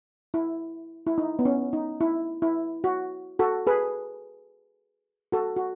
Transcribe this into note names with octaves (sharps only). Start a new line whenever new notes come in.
E4
E4
D#4
B3
C#4
D#4
E4
E4
F#4
F#4 A4
G#4 B4
F#4 A4
F#4